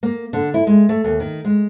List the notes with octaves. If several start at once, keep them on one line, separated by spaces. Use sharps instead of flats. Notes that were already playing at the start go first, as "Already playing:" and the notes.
A#3
D3
E4
G#3
A3
D#2
D#3
G#3